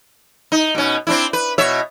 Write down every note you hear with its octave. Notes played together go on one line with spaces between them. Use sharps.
D#4
B2 C#4
C4 D4 E4
B4
B2 C#5 E5